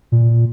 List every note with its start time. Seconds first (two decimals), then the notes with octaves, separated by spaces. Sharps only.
0.12 A#2